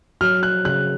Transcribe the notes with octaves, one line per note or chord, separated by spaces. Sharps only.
F#3 F6
F#6
C#3 F#6